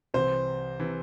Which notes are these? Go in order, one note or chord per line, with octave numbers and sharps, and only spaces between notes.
C2 C3 E3 C5
C3 E3